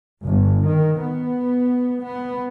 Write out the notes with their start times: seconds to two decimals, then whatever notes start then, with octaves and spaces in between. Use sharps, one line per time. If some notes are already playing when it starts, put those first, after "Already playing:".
0.23 G1
0.67 D#3
1.01 B3
2.03 B3